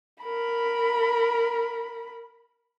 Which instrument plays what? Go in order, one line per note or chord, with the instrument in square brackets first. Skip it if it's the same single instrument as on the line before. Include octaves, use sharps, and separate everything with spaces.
[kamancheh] A#4 B5